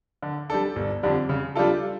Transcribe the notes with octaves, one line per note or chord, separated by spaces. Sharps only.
D3
G3 D4 A4
G1
F2 D3 G3 D4
C#3
G3 D4 F4 A4